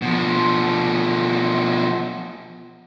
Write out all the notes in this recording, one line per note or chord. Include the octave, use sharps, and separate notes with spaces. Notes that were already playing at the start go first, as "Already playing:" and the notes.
B2 F3